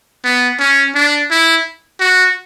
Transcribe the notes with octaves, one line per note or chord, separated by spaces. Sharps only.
B3
C#4
D4
E4
F#4